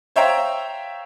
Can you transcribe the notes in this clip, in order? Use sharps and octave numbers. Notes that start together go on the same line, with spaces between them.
C5 C#5 E5 F5 G5 A#5